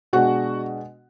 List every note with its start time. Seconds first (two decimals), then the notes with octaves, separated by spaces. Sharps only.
0.13 B2 G#3 D4 F#4 F#5